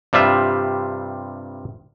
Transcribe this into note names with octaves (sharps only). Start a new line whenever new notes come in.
G2 C3 G3 F4 E5